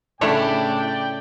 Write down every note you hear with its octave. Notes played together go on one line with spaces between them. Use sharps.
A2 C#3 A3 D4 E4 C#5 D5 G5